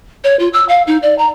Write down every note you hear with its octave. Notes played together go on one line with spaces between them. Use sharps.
C#5
F4
E6
F5
D#4
D5
A#5